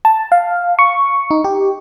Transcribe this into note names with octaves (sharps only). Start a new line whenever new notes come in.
A5
F5
C#6
D#4
G4